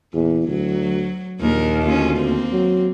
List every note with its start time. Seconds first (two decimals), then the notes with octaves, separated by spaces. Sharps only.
0.13 E2 A#2
0.47 D2 F#3
1.41 A#1 D#2 A#2 A#4
1.83 D2 C#4 F4
2.18 A#3 C4
2.52 F#3